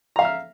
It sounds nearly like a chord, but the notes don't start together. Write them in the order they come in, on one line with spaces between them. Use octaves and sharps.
A#5 F5 E5 F6